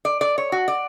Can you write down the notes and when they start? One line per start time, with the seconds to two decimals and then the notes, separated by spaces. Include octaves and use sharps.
0.05 D5
0.21 D5
0.38 C#5
0.52 F#4
0.68 D5